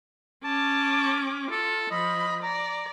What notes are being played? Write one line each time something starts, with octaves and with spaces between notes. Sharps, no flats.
C#4 A5 D6
F4 A4
F3 D#5 B5
D5 A#5